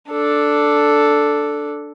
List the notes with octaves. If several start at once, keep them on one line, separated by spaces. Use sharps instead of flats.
D4 A4